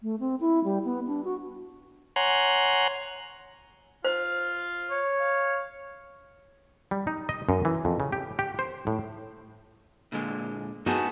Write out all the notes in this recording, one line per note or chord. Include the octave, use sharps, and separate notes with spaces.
A3
C4
E4
G3
B3
D4
F#4
C#5 F#5 G#5 A#5 C6 F#6
F4 C5
C#5
F5
G3
D#4
D#5
F#2
E3
F2
C#3
G4
G4
C5
A2
A#2 D3 G#3
B3 D#4 F#4 G#4 A5